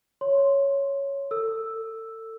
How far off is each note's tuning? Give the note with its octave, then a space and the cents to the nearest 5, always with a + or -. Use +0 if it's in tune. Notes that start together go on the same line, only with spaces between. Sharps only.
C#5 +0 C6 +0
A4 +35 E6 +0